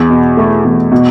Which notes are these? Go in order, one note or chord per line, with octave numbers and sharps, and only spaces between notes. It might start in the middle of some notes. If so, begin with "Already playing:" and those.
Already playing: E2
B2
A3
E2
B2